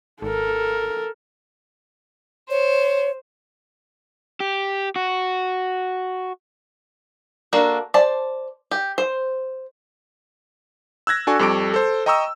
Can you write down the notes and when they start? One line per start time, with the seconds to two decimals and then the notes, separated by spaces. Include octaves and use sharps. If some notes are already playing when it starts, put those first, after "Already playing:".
0.22 G#1 A4 A#4
2.50 C5 C#5
4.40 G4
4.96 F#4
7.53 A#3 D4 F#4 A4
7.94 C5 D5 A5
8.71 G4
8.98 C5
11.07 E6 F#6 G#6 A#6
11.27 D4 F#4 A4 G#5 C#6
11.39 F2 G3 A4 C#6 D6 D7
11.74 A4 C5
12.06 D#5 G5 A#5 C#6 D#6 E6